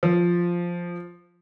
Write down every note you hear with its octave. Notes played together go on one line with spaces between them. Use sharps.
F3